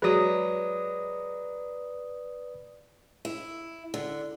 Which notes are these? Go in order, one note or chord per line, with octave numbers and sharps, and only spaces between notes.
F#3 G#3 B4 D5 D#6
E4
D3